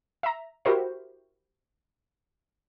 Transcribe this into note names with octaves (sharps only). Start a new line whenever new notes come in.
E5 A#5
E4 F#4 G4 A#4 C5 E5